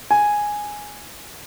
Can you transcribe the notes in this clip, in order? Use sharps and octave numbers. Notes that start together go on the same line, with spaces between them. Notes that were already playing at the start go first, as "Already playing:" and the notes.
G#5